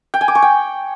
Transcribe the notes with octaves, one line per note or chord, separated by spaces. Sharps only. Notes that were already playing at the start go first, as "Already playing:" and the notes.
G5
G#5
D6
C#6
G5